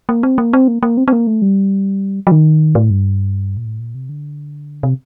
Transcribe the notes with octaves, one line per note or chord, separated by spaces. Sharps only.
A#3
C4
A#3
C4
A#3
A#3
C4
C4
A#3
A3
G3
F#3
D#3
A2
G2
A#2
A2
A#2
C3
D3
C3